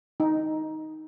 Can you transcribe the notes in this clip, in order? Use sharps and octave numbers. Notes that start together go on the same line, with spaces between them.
D#4